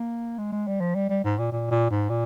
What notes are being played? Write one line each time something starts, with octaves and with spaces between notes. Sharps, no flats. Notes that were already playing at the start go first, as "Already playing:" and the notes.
Already playing: A#3
G#3
G#3
G3
F3
G3
G3
G#2
A#2
A#2
A#2
G#2
A#2